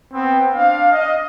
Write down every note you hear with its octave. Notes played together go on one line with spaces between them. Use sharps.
B3 C4
D4 F5
D#5